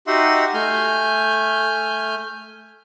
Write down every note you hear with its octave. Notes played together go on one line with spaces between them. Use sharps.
D#4 F#4 G4 E5 F#5 C6
A3 G#5 F6 G6